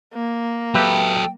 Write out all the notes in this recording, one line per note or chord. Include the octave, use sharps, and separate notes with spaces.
A#3
F#3 G4 A4 B4 E5 G5